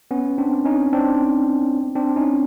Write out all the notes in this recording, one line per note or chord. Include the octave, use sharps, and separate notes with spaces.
B3 C#4
C4 D4
C#4 D#4
C4 D4
C4 D4
C#4 D#4